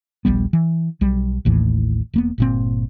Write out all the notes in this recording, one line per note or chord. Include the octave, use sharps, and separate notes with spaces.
D#1 A#1 G3 B3
E3
B1 G3
A1 D#2 A2 E3
E1 A#3 B3
G1 A#2 C4